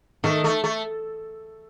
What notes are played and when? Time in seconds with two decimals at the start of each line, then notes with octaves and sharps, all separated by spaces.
0.24 D#3 A3
0.44 A3
0.64 A3